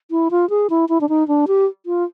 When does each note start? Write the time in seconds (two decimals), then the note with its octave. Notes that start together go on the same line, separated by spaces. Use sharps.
0.11 E4
0.31 F4
0.50 G#4
0.70 E4
0.89 E4
1.01 D4
1.09 D#4
1.28 D4
1.48 G4
1.86 F4